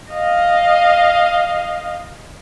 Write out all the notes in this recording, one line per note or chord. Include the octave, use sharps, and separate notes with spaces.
D#5 F5